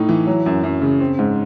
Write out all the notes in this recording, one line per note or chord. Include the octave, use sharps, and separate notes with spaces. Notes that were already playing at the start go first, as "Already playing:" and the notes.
Already playing: A2 A3 D#4
E3
F#3
F#2
F#2
C#3
C4
G#2